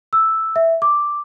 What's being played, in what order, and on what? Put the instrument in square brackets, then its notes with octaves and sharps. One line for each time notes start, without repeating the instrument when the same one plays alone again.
[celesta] E6
E5
D6